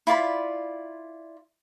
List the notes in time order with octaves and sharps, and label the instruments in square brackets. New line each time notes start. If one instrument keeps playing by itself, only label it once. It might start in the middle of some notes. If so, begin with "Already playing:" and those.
[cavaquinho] E4 F4 D5 B5